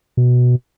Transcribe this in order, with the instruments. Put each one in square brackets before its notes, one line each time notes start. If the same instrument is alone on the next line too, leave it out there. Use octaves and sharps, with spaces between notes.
[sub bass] B2